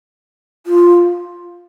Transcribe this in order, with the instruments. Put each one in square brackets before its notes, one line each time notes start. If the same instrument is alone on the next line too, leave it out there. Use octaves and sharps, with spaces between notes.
[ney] F4